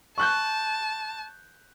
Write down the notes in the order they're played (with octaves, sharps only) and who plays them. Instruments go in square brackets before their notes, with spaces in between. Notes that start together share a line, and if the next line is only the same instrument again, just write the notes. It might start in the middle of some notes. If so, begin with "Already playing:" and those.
[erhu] A5 [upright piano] C#6 F#6 G6